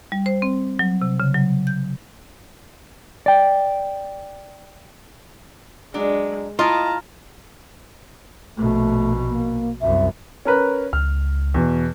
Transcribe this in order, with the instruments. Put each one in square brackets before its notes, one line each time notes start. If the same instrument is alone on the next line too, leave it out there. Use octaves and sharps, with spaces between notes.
[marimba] G3
C5
C4
F#3
C3
C#3
F#3
G6
[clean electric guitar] D5 G5
[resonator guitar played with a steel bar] F#3 D4 [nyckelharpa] G#3
[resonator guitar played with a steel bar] E4 D#5 [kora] F4 [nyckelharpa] A5 A#5
[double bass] A#1 B2 [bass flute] A3
[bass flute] A#3
[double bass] C2 F#2 [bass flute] E5
[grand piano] C#4 A#4 B4
[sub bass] C#2 [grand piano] F6
[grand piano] E2 B2